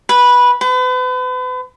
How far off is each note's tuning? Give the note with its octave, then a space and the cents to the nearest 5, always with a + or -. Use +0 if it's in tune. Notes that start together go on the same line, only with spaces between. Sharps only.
B4 -10
B4 +40